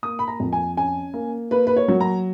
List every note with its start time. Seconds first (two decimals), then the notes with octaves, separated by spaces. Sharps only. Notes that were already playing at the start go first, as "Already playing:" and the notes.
0.03 A#3 D#6
0.19 B5
0.28 A#5
0.40 F2
0.53 G#5
0.77 C#4 G#5
1.14 A#3
1.51 A#3 B4
1.67 B4
1.76 C#5
1.88 F#3
2.01 A#5